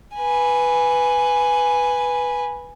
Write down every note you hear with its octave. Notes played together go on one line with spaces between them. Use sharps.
B4 G#5